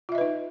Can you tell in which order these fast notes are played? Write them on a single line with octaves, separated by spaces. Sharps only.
F4 E5 D#5 B4 D#4